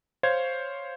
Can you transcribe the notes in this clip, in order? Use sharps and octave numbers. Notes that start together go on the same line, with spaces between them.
C5 C#5 F5 G#6